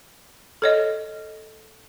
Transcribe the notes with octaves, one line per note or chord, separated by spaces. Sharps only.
A4 C#5 D#5